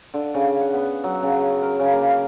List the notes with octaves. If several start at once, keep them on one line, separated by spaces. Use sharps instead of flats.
D3
C#3
F#5
B3
F#3
C#3
A#4
C#3
A#3
F5